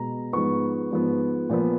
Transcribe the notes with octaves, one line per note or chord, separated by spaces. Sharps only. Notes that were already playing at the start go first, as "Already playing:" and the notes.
Already playing: B2 G#3 B3 A#5
G#2 F3 B3 C#6
G#2 F3 B3
A#2 F3 B3